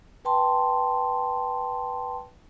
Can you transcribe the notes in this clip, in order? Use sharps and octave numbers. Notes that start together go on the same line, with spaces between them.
B4 G5 A5 C6